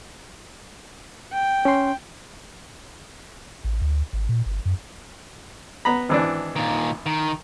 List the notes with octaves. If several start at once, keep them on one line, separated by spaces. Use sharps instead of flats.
G5
C#4 C6
A1
D2
G#1
A#2
G1
F#2
B3 A#5 B5
G#1 E3 D4
A#2 D#3
D#3